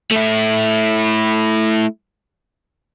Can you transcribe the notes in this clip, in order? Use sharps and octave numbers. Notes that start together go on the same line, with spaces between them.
A3 E4